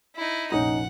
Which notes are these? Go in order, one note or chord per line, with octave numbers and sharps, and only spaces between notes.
D#4 E4
F1 A#1 C#4 D#4 F#5